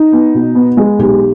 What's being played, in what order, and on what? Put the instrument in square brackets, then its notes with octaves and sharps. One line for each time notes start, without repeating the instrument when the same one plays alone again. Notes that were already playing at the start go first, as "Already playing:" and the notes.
Already playing: [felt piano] D#4
[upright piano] B3
B2
B3
G#3
[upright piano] B1 [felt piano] G4